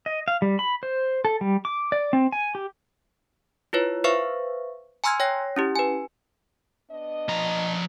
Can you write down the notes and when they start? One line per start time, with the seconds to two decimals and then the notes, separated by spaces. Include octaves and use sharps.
0.06 D#5
0.28 F5
0.42 G3
0.59 B5
0.83 C5
1.25 A4
1.41 G3
1.65 D6
1.92 D5
2.13 C4
2.32 G#5
2.55 G4
3.73 E4 F4 B4 C#5
4.04 B4 C5 E5 F5 C#6
5.04 G#5 A#5 C6 E6 F6 G#6
5.20 C#5 G5 A#6
5.56 C#4 E4 G4
5.75 B4 G#5
6.91 B3 D4 D#5
7.29 F3 A#5